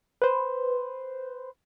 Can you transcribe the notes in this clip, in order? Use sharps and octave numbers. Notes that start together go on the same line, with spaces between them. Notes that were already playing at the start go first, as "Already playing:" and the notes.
B4 C5